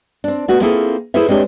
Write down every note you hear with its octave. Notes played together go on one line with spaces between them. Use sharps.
C4 D4
A3 B3 F#4
A#3 C4 E4 F4 G#4 A4
E4 G#4 A4 B4 C5 E5
G#3 C4 D4 G4 C#5